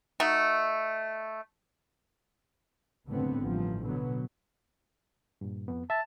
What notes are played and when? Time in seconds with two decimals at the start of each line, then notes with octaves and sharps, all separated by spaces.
0.20 A3 D#4 F#4
3.07 F#1 A2 D3 B3 C4
3.42 A1 G2 F3
3.83 B2 D3 F#3 B3
5.41 G2 A#2
5.68 F2 B3
5.90 E5 A5